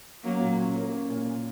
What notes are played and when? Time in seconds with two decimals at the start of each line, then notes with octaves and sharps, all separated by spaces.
0.24 F#3 A#3 C#4
0.41 A#2
0.58 C#4
0.76 A#3
0.93 C#4
1.10 A#2